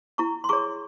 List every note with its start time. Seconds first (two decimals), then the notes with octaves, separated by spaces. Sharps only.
0.18 E4 A#5 C#6
0.44 C6
0.49 G#4 C#5 A#5 C#6